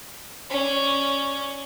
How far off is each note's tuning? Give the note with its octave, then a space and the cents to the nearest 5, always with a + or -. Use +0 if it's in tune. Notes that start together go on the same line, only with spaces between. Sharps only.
C#4 +0 D5 +0